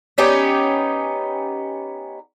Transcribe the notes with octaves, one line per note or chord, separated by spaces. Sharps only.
B3 C#4 D#4 G4